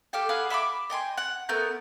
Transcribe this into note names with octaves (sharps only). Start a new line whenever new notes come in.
G4 A4 F5 G5
G#4 B4 F5 F#5
E5 B5 C6 D6
D#5 G5 G#5 C6
F#5
A3 B3 A#4 G6